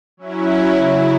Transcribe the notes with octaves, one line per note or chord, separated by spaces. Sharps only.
F#3 C#4 E4
C#3 F#3 E4